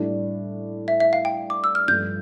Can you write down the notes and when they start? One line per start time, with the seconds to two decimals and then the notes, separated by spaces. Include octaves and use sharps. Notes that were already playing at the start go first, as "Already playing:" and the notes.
Already playing: A2 G3 D4 D5
0.88 E5
1.00 E5
1.13 F5
1.25 G5
1.50 D6
1.64 E6
1.75 F6
1.88 G2 F3 A3 G6